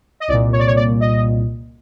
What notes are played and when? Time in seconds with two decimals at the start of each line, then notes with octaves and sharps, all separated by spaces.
0.20 D#5
0.28 C2 D5
0.33 A#2
0.52 C#5
0.59 D5
0.67 C#5
0.76 D5
1.00 D#5